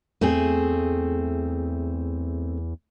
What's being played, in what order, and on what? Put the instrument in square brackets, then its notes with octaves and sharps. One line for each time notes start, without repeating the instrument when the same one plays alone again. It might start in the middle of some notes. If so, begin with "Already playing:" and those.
[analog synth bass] E2 [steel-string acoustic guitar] A3 C4 G#4